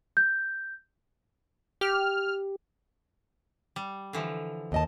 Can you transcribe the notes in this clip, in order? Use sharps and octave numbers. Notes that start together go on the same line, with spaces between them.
G6
G4 F6
G3
D3 E3 F3
D#2 D#5 A5